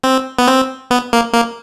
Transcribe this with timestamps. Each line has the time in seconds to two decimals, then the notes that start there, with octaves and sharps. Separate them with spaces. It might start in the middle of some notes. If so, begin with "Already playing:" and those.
0.04 C4
0.38 B3
0.47 C4
0.91 B3
1.13 A#3
1.34 A#3